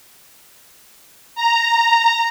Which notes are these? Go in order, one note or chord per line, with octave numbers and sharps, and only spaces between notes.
A#5